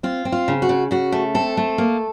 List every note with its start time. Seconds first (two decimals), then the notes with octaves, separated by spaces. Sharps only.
0.03 C4 F4
0.25 C4
0.32 F4
0.48 C#3
0.62 F#4
0.69 C#3
0.91 C#3 F#4
1.12 A3
1.34 C4 A4
1.57 A3
1.78 A#3